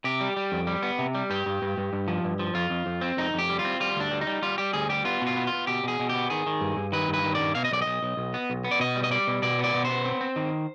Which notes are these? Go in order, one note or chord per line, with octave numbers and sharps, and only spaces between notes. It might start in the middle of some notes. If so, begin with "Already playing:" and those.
C3 G4
G3
G3
F2
G3
B3
C3
G3
G2 G4
G2
G2
G2
G2
F3
G2
F3
F2 F4
F2
F2
C4
F2 D#4
F2 G4
G3
F4
C4
G3 F4
D2 D4
G3
D#4
G3
G3 F4
G3 G4
D2 G#4
G3 G4
B3 F4
B2
F4
B3
F4
B3
B2 G4
B2 G#4
B2
G4
B3
D#3 G#4
D#3
G2
G2
D#3 B4
G2
B4
D#3
D5
G2
B2 F5
D#5
B1 D5
B1 D#5
B1
B1
B3
B1
B3
D5
B2 D#5
G3
D#5
G3 D5
B2
B2 D5
B3 D5
B2
B3 C5
C4
C4
D#3